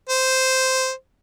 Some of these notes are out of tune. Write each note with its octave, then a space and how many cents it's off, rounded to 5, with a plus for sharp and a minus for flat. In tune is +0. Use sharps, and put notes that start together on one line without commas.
C5 -5